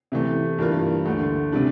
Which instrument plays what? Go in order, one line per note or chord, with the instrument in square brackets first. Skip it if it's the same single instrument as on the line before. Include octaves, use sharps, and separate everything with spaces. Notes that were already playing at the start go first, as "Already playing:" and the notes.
[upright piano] C3 E3 A3
G2 E3 A#3 F4
D2 D3 A3
C3 G3 D4